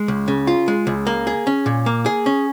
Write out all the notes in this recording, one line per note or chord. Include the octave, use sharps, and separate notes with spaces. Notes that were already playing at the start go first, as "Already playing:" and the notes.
Already playing: G#3
C#2
C#3
F4
G#3
C#2
A#3
G#4
C#4
A#2
A#3
G#4
C#4